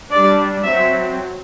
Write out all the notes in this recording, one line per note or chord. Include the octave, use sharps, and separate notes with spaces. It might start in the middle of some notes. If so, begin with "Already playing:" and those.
G3 D4 D5
F#3 C4 E5